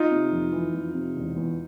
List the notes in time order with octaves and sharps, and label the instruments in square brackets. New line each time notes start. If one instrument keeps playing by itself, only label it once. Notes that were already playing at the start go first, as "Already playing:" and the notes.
Already playing: [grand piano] D#4 F4
[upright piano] C3
F1
E3
F2
C3
E1
E2